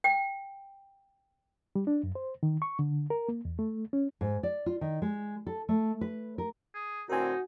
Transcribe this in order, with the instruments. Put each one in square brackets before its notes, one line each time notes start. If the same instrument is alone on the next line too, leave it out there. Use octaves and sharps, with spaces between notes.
[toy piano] G5
[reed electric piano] G3
D4
F#2
C5
D#3
C#6
D3
A#4
A#3
E2
A3
C#4
[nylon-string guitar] G#2
D5
F4
D#3
G#3
A4
A3
B4
A#4
[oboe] G#4
[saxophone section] A2 D3 C4 [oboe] D#4 [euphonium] F#4 [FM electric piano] A#4 G#5